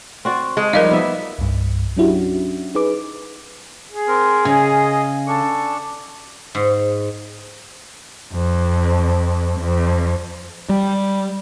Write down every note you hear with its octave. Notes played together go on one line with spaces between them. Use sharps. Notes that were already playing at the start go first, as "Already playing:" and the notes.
C4 F#4 D5
G#3
F3 G3 D#4 A#4 D#5 F5
B3 E5
C2 G2
F#3 C#4 D4 E4 F#4 G4
D#4 G#4 B4 D6
G#4
C4 A#4
C#3 D#5 G#5
D4 A4 C#6
G#2
F2
F2
G3